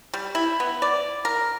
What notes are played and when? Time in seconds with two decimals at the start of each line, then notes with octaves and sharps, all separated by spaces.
0.14 G3
0.35 E4
0.60 B3
0.82 D5
1.25 A#4